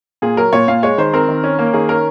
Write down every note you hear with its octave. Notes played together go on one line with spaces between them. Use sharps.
A#2 G#4
F#3 A#4
A#2 C#5
A#2 F5
G#3 C#5
D#3 C5
C4 A#4
D#3
C#4
A#3
D#3 G#4
C#4 A#4